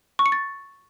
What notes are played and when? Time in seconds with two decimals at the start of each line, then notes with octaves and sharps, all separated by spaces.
0.19 C#6
0.26 C#7
0.32 A6